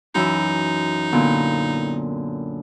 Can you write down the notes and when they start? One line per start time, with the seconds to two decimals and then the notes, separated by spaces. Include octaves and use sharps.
0.15 F#2 E3 D#4 E5
1.12 A#2 D3 B3